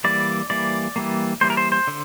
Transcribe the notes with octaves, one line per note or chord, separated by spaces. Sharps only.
E3 G3 A#3 D5
E3 G3 A#3 D5
E3 G3 A#3
E3 G3 A#3 C5
A#4
C5
C5
D3